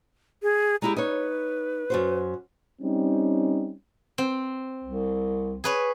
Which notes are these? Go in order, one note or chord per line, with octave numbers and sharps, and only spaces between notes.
G#4
G#3 E4 G4 A#5
D#4 B4 C#5
F#2 F#4 C5
G3 C4 C#4 D#4
C4
C2
G#4 B4 C#5